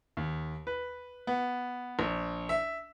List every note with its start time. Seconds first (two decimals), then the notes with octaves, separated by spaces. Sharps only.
0.17 D#2
0.67 B4
1.27 B3
1.99 A#1
2.49 E5